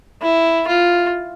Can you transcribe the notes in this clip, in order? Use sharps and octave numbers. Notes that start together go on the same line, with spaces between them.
E4
F4